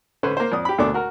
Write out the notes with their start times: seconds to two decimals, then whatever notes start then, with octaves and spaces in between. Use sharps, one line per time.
0.23 D3 A3 C#4 B4 C5
0.37 A#3 C5
0.52 F2 D5 D#6
0.65 G4 B5
0.78 D2 B2 A3 A#3 D4 D6
0.94 F#4 A#4